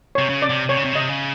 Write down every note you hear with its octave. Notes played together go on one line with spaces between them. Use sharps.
C3 C#5
C#3
D5
C3
C3 C#5
C#3
C3
C#3
C3 D#5
C#3